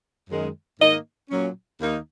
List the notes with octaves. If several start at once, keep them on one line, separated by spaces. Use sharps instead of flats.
F#2 D#3 G#3
G#2 D#3 A#3 D#4 D#5
A#2 F#3 C#4
D#2 D#3 A#3 D#4